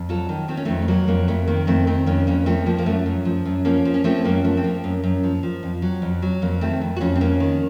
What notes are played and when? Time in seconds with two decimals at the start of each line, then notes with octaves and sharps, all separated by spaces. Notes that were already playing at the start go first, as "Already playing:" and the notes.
Already playing: F2
0.09 F#3 F4 A4
0.29 D#3
0.48 D#3 C4
0.57 C#4
0.65 F2 A3 C4
0.82 A3
0.88 F#3 A#3
1.08 F2 A#3
1.28 F2 A3
1.47 D#3 A#3
1.67 F2 A3 C4
1.87 D#3 C4 D#4
2.06 F2 A#3 C#4
2.27 F2 A#3 C#4
2.46 F3 A3 C4
2.66 F3 A#3
2.79 A#3
2.86 F#2 A3
3.06 F#2
3.25 F3
3.45 F#2
3.65 F3 A#3 C#4
3.85 F3
3.94 C#4
4.04 F3 A3 C4
4.25 F#2 A#3
4.44 F3 A3
4.57 C4
4.64 F3 A#3
4.84 F#2
5.04 F#2
5.24 F3
5.43 F3
5.63 F2
5.82 F#3
6.02 F2
6.22 F#3
6.42 F2 A#3
6.61 D#3 A3 C4
6.81 F2
6.96 F#4
7.01 F2 C#4 F4
7.16 C4
7.21 F2 A#3 C#4
7.40 D#3